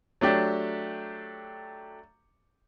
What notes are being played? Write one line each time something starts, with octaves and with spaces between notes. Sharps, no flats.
F#3 A3 D4 G4